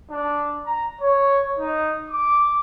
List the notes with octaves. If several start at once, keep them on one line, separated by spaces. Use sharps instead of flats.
D4
A#5
C#5
D#4
D6